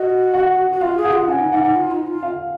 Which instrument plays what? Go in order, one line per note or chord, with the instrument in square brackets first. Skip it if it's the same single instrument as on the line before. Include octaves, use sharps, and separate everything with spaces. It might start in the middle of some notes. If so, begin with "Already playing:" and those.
Already playing: [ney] F#4 [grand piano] D#5
[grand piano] F#5
[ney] F#4
[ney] F4 [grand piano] F5
[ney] G#4
[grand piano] F#5
[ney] F4
[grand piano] F#5
[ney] C#4 [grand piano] G#5
[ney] D#4
[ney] D#4 [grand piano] F#5
[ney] D#4
F4
D#4
F4
[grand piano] F5